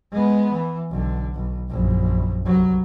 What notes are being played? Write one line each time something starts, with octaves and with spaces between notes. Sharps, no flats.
G#3 B3
E3
B1 D3
B1
A#1 F#2
C2 F#3